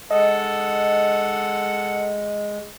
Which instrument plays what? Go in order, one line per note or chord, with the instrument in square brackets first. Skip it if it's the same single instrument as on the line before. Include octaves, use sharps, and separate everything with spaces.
[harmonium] G#3 [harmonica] A4 F#5 [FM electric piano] D#5